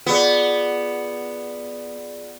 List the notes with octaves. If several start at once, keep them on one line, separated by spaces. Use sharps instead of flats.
B3 F4 G#4 D5